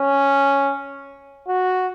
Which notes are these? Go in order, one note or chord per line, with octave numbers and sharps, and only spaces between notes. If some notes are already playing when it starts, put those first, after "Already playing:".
Already playing: C#4
F#4